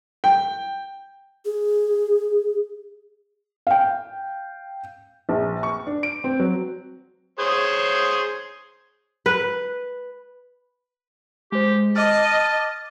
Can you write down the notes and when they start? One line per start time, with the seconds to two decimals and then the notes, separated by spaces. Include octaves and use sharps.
0.24 G5
1.45 G#4
3.67 F5 G5
5.29 A#1
5.63 C#6
5.87 D4
6.03 D7
6.24 C4
6.40 F#3
7.39 G#4 C5 C#5
9.26 B4
11.52 G#3 G4 C5
11.96 D#5 A5 D6 F6